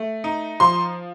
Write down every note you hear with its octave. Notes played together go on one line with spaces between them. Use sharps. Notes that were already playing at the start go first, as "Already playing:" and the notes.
Already playing: A3
D#4
F3 C6